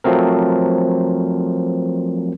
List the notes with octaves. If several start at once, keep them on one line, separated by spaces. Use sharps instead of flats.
F3 F#3 A3 C4 A#4